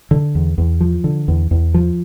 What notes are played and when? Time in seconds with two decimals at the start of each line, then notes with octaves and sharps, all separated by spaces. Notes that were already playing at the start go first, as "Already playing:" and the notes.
0.11 D3
0.35 E2
0.58 E2
0.81 F3
1.04 D3
1.28 E2
1.51 E2
1.74 F3